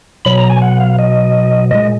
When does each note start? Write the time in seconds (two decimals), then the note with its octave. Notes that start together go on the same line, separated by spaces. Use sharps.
0.25 B2 F#3 B5
0.38 A#5
0.50 G#5
0.62 F#5
0.80 F5
0.99 D#5
1.71 A#2 G#3 D#5